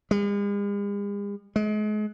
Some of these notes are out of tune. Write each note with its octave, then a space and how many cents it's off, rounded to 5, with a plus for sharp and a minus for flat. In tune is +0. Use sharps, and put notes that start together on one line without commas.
G#3 -45
G#3 +35